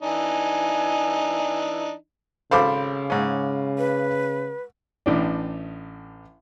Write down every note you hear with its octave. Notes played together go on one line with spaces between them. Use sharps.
E3 D4 D#4 G#5
G#1 C#3 A4 C5 F5 B5 D6
G#2 C#4
B4
A1 A2 D4